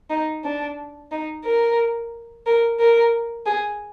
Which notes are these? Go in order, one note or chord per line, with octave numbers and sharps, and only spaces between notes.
D#4
D4
D#4
A#4
A#4
A#4
G#4